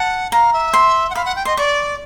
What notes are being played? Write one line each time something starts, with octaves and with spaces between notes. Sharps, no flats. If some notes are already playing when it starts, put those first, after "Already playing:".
Already playing: F#5 A5
F5 A#5
E5
C6
F#5
F5 B5
F#5
G5
D#5 C6
D5 C#6